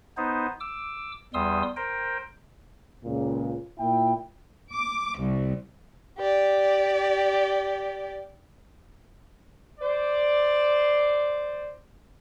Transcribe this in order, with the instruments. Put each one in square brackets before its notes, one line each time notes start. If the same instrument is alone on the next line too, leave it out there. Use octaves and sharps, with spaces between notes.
[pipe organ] B3 D#4 C5
D6 E6
E2 G3 C6 D#6 E6
A#4 C5 G5
[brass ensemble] C#2 A#2
A#2 E4 G5
[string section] D6
C2
[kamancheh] G4 D5
[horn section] C5 D5